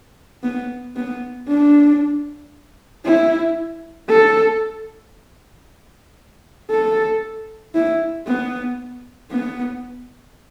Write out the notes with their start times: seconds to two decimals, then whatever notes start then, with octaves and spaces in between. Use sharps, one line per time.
0.43 B3
0.96 B3
1.48 D4
3.05 E4
4.09 A4
6.70 A4
7.75 E4
8.27 B3
9.31 B3